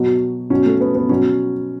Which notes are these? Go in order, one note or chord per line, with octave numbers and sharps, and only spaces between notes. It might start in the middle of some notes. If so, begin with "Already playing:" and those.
Already playing: B2 F#3
B2 F#3 C#4
A3
B3
B3
B2 F#3 C#4